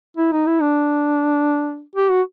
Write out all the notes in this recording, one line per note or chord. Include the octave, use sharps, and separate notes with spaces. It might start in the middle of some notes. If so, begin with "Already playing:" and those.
E4
D#4
E4
D4
G4
F#4